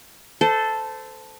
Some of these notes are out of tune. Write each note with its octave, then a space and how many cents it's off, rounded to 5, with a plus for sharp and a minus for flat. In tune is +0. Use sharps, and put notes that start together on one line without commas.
A4 +0 C5 -25